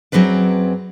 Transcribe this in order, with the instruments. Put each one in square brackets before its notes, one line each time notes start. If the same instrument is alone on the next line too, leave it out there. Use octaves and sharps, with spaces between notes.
[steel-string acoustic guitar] F#2 F#3 C4 G#4 B4 D5